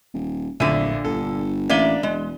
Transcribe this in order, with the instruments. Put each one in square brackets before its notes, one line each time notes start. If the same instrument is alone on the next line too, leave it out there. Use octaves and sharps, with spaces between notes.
[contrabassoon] D#1
[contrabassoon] D1 [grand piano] A#1 E5 D#7 [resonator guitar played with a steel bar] A#2 D3
[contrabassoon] G1 [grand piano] A4
[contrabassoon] A1 [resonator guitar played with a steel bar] A#3 D5 E5 [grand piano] D4 D#7 G7
[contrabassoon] E1 [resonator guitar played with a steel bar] G#3